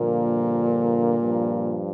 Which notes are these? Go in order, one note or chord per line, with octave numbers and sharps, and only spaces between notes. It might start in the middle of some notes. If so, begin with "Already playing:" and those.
Already playing: G2 A#2 D3 F3 A#3
G2 F3